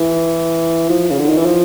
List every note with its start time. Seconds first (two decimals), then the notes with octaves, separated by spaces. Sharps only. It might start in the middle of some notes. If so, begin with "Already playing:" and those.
Already playing: E3
0.90 F3
1.11 C#3
1.19 D3
1.28 D#3
1.37 E3
1.46 F3